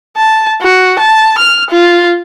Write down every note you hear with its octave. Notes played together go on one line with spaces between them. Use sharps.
A5
F#4
A5
F6
F4